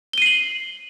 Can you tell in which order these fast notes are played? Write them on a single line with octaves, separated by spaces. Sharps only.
G7 D#7 C7 F#7